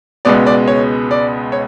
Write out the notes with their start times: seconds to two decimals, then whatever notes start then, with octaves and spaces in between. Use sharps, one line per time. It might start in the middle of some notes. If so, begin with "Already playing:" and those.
0.25 C#2 B2 G#3 B3 D5
0.46 D5
0.67 C#5
1.11 D5
1.52 C#5